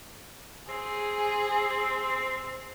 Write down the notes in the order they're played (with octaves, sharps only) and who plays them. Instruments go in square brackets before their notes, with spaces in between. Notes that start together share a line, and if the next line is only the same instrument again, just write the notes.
[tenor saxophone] C4 [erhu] G#4